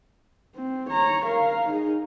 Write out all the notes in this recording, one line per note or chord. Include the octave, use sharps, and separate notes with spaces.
C4
C#5 A#5
A#4 F5
D#4 G#4